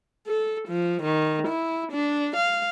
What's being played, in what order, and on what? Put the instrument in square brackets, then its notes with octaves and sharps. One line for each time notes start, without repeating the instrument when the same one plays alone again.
[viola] A4
F3
D#3
E4
D4
F5